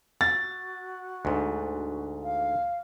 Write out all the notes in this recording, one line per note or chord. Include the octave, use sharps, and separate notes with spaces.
F#4 A6
D2 G#2
F5